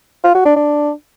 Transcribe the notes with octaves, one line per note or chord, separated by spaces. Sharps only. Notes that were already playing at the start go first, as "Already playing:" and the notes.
F4
F#4
D4
D4